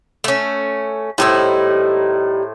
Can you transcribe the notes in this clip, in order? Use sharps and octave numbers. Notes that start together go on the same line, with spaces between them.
A3 C#4
A2 G3 D#4 E4 C5